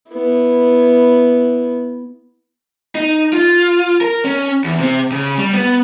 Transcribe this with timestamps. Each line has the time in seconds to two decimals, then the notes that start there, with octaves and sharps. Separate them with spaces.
0.11 B3 E4
2.95 D#4
3.33 F4
4.01 A#4
4.24 C#4
4.64 E2
4.79 C3
5.12 C#3
5.38 G3
5.53 B3